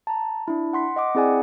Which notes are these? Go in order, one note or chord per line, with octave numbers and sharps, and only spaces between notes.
A5 A#5
D4 E4
F#5 C6 B6
D#5 F#5 D6
C4 E4 G#4 D5 F#5 G#5